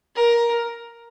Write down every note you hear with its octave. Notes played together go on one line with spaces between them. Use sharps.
A#4